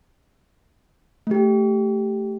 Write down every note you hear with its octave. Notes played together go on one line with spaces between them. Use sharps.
A3 G4